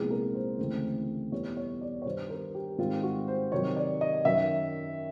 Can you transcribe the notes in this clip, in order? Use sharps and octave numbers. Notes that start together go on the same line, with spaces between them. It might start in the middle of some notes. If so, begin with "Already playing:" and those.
Already playing: C2 A#2 F3 G#3 B3 G#4
A#4
C5
D2 C#3 E3 A3 C4 C5
E2 B2 G3 B3 C#5
C#5
D5
C#5
G2 D#3 G3 B3 C5
A#4
G4
G#2 D#3 G3 C4 F4
F#4
C5
C3 D#3 F#3 C#5
D5
D#5
F#2 D#3 F#3 E5